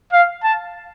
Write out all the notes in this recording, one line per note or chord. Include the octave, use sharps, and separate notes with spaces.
F5
A5